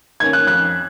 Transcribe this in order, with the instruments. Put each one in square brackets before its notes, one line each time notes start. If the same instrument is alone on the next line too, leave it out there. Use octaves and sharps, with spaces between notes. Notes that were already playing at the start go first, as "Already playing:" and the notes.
[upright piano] D#3 A#3 C#4 G#6
F#6
F2 F#6